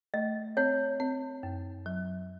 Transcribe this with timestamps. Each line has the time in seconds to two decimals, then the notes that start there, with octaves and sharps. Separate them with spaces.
0.14 A3 D#5
0.57 C4 C#5
1.00 C4
1.43 F#2
1.86 F#3